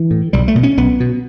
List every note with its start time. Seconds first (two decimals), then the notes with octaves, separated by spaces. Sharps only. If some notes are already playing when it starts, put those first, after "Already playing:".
Already playing: E3
0.11 A2
0.33 B1 G3
0.48 A3
0.55 B2
0.63 C#4
0.77 B1 B3
1.00 B2